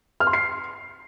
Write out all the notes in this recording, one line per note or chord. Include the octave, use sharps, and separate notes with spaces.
F6
C6
C7